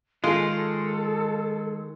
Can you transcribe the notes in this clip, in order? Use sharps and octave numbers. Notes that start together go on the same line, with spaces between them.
D#3 G#3 F4 G#4 A4